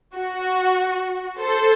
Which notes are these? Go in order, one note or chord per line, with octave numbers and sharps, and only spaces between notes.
F#4
A4 C5